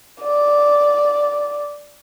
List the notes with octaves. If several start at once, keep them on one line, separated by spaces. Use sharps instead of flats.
D5